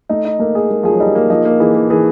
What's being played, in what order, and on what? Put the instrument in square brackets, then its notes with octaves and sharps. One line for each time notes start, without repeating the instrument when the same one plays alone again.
[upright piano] A3 [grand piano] D#4
[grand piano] D#4
[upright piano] A3 [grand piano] A#3
[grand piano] G#4
[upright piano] G#3 [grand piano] A#3
[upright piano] F3 [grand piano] G#4
[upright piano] F#3
[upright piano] G3 [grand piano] D#4
[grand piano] A#3
[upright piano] F3 [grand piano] D#4
[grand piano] A#3
[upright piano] E3 [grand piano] G#4
[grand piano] A#3
[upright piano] E3 [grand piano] G#4